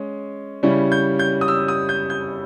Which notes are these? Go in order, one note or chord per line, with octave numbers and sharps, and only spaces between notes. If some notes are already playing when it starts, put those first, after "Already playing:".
Already playing: G#3 C#4
C#3 G3 C#4 E4
G6
G6
D#6
E6
D#6
G6
G6